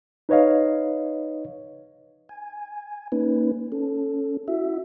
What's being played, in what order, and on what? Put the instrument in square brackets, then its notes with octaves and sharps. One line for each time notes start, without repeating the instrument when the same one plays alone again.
[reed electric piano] D#4 B4 C#5 D#5 F5
[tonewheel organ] G#5
A#3 C#4 D#4 B4
C#4 A4
E4 F#4 E5